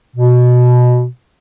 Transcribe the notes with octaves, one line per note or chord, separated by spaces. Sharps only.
B2